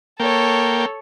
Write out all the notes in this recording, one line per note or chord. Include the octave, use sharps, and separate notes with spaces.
A#3 A4 C#5 G5